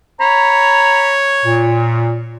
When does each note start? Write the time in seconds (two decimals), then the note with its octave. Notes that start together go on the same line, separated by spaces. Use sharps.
0.20 C#5 A#5 B5
1.45 A#2